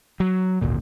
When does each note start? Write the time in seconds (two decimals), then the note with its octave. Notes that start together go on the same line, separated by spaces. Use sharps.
0.20 F#3
0.61 G#1 D2 A#2